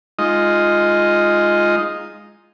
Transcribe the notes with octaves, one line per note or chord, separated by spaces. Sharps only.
G#3 D#4 F4 D#5